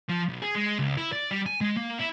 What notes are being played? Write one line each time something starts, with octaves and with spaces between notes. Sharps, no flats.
F3
B1
G#4
G#3
C#2
E4
D5
G3
G#5
G#3
A#3
E4